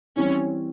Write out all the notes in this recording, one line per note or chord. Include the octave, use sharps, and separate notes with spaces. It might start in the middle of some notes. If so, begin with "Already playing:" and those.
E3 G3 C4 C#4 E4